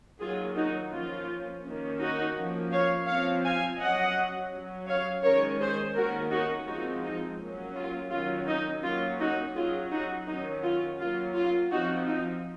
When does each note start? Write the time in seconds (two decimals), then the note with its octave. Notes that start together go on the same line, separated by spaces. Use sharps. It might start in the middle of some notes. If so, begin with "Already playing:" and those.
0.20 D#3 F#3 A#3 F4 G#4
0.56 D#4 F#4
0.92 F3 A#3 C#4 F4
1.64 D#3 A#3 C#4
2.00 D#4 F#4
2.36 F3 A#3 C#4
2.72 C#5 F5
3.07 F3 C4 C#5 F5
3.44 F5 G#5
3.80 F#3 C#4 D#5 F#5
4.52 F#3 C#4
4.87 C#5 F5
5.23 D#3 G#3 C#4 A#4 C#5
5.60 G#4 C5
5.96 D#3 A#3 C#4 F#4 A#4
6.31 D#4 F#4
6.67 F3 G#3 C4 D#4 F#4
7.04 D#4
7.40 F#3 A#3 C#4
7.75 F4
8.11 D#3 F#3 C#4 F4
8.47 D#4
8.83 F#3 A#3 C#4 F4
9.20 D#4 F#4
9.55 F#3 C#4 F4 G#4
9.91 D#4 F#4
10.27 D#3 F#3 C#4 D#4
10.63 F4
10.99 F#3 A#3 C#4 F4
11.35 F4
11.71 F3 C4 D#4 F#4
12.08 D#4